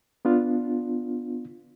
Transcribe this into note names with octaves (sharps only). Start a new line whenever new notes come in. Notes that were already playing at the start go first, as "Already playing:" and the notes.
B3 D4 F4